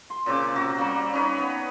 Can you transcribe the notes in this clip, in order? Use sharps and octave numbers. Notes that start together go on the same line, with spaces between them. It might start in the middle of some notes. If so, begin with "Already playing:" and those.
C6
A#2 C#3 C4 D6
C3 F#4
G3 A#3
C#4 D#4 B4 C#5
B3